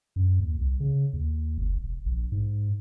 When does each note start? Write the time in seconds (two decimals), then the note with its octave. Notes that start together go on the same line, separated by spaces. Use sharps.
0.16 F#2
0.40 D#2
0.58 C2
0.80 C#3
1.13 D#2
1.58 F#1
1.78 E1
2.06 A#1
2.32 G#2